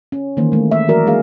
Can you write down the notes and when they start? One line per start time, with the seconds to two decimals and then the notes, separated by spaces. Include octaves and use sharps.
0.12 C#4
0.37 D#3 E3 A#3 C5
0.52 G#3 A3
0.71 E5
0.88 E3 F#3 F#4 A#4 D5
1.07 G#3 A#3 D4 G#4 F5